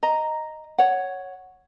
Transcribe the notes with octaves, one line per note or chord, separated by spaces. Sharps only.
D#5 A#5
C#5 F#5